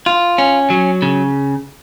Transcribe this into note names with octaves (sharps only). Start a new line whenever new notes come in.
F4
C#4
F#3
C#3